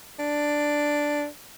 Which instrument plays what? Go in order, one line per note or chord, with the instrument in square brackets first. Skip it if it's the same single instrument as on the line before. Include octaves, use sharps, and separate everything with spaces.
[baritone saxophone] D4